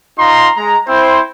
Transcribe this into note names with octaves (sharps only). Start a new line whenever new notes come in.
D#4 F4 A#5 C6
G#3 A#5
C4 E4 C5